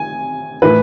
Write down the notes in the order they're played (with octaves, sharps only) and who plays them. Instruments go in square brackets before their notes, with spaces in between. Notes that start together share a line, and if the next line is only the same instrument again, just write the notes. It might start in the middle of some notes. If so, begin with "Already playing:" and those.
Already playing: [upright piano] G#5
A2 E3 B4